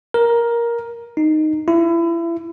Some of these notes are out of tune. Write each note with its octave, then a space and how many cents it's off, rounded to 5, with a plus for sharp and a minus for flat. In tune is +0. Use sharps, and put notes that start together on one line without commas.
A#4 +10
D#4 -5
E4 +30